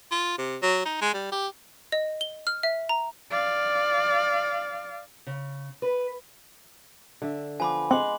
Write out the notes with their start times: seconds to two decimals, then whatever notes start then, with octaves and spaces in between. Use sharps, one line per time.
0.12 F4
0.38 C3
0.62 F#3
0.86 D#4
1.02 G#3
1.14 G3
1.32 G4
1.92 D#5
2.21 G7
2.47 F6
2.63 E5
2.89 A#5
3.31 D5 F5
5.27 C#3
5.82 B4
7.22 D3 E5
7.60 F3 B3 G#5 B5 D6
7.91 G#3 C4 F#5 C6 D6 F#7